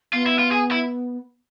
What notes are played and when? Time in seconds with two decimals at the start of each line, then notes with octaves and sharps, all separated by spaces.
0.13 B3 F4
0.26 E4
0.39 F4
0.52 G#4
0.71 E4